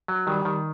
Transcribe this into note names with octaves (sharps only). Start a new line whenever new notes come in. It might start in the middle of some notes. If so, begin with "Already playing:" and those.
F#3
D#3 G3
D#3